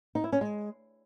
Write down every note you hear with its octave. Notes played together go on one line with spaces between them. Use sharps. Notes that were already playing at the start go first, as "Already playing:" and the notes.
D#4
E4
C#4
G#3